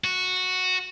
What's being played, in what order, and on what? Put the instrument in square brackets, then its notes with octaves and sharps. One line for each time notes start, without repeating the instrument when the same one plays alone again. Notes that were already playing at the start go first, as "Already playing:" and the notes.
[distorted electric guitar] F#4